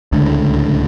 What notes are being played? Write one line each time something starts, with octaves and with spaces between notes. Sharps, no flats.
D1 C#2 A2 D3